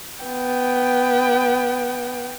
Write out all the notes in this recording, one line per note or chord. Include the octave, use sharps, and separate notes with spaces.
B3 G5